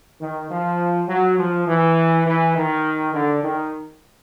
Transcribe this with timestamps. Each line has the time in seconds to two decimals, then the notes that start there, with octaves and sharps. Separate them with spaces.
0.20 D#3
0.50 F3
1.09 F#3
1.38 F3
1.67 E3
2.26 E3
2.56 D#3
3.14 D3
3.44 D#3